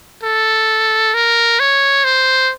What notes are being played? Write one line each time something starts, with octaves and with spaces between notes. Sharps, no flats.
A4
A#4
C#5
C5